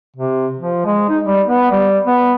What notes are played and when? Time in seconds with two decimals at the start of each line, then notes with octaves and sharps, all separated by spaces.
0.16 C3
0.58 F3
0.85 G#3
1.09 D#4
1.25 G3
1.47 B3
1.71 G3
2.06 B3